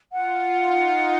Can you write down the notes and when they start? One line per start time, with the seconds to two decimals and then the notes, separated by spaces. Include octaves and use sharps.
0.12 F4 F#5
0.60 D#4